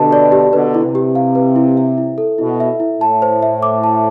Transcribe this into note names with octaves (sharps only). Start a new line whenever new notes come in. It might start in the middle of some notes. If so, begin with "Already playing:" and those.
Already playing: B2 D3 G4 B4 A5
D5
G4
B2 D3 B4
E4
C3
G4
F5
B4
E4
E5
E4
A4
B2 E4
E5
E4
A2 A5
C5
E5
D6
A5